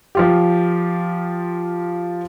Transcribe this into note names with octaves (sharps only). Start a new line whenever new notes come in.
F3 F4 G4